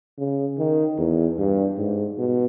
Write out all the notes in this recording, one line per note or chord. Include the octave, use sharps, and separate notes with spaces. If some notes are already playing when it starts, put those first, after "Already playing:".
C#3
D#3
E2
G2
G#2
B2